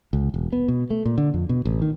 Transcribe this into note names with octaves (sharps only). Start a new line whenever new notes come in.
C#2
E1
B3
B2
A3
A#2
D3
F2
B2
A1
D#3